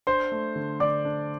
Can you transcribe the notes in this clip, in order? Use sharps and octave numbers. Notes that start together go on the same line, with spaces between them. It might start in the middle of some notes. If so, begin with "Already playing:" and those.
D4 C5 C6
A3
D3
D3 D5 D6
D4